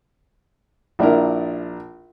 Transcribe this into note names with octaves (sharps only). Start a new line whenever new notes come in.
A#1 D4 E4 A#4